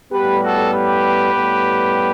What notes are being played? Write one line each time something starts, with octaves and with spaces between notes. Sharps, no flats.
A2 G3 B3 G4 B4
F#4 A4
G4 B4
A2 G3 B3